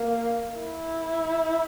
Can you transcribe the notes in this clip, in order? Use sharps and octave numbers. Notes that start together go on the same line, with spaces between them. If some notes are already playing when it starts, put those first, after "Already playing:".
Already playing: A#3
E4